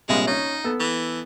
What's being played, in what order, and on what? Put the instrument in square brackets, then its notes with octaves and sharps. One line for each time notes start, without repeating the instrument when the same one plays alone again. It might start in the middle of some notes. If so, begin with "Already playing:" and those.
[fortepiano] A#1 C3 G3 [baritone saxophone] G#3
[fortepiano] C#4 [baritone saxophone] D#4
[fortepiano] B3 A4
[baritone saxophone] E3